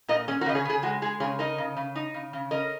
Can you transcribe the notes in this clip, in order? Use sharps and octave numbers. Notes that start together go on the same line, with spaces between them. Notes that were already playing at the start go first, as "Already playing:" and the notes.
A#2 A#4 D#5
C#4 G#4
F#4 A#4
C#3 D#5
G#4 C#5
C#3 G#4
G#3 F#4
G#3 G#4
C#3 G#4 C#5
D#4 A#4 D#5
C#3
C#3
D#4
C#3
C#3
C#4 A#4 D#5